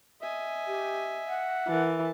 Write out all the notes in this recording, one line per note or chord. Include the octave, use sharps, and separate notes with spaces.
D#5 E5 G#5
G4
F#5
E3 A#4 A5